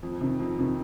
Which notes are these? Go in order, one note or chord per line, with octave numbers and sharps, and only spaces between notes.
F2
C3 D#3
F2
C3 D#3